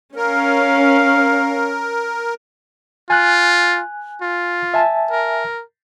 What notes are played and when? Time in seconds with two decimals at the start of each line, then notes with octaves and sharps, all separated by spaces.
0.16 C#4 A#4 F5
3.10 F4 G#5 F#6
4.22 F4
4.74 E5 G#5 A5
5.11 A#4